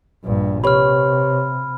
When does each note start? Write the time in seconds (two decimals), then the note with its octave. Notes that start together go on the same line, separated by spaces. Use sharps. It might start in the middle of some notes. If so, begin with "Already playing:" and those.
0.24 A#1 G2
0.64 C3 G4 B4 C#5 B5 F6